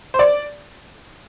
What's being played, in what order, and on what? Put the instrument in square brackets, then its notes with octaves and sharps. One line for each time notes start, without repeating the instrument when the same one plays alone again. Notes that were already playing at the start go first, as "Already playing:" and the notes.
[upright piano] C5
D5